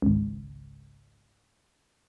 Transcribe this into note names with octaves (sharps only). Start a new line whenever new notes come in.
G#1 C#2